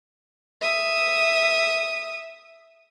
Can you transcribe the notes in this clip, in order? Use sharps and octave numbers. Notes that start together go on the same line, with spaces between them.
E5 D#6